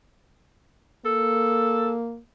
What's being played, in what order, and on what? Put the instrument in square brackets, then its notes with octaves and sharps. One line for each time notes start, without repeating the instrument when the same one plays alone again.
[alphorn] A#3 [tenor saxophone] A4